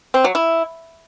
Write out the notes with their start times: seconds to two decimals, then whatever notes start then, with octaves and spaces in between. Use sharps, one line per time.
0.14 C4
0.24 F#3
0.35 E4